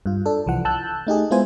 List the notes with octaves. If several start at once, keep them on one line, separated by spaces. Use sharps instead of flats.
G2 F4
D4 A4
C2 E3 F3 F#5
A5 E6 F#6 G6
A3 D#4 G4 G#4
G#3 B3 E4 F4 C5 G#5